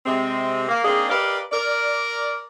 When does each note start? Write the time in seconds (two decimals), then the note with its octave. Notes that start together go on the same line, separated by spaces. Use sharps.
0.06 C3 G#3 C4
0.69 A#3
0.84 A#3 C4 D4 D#4 G#4
1.09 G4 A#4 B4 D5 D#5 F5
1.52 A#4 D5